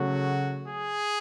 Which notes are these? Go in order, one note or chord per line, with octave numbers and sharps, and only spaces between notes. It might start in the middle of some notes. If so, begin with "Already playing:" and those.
Already playing: C#3 F#3 A3 F#4
G#4